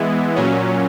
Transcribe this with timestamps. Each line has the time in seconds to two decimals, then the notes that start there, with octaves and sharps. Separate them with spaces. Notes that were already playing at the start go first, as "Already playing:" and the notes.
Already playing: E3 G#3 B3 E4
0.35 A#2 F#3 C#4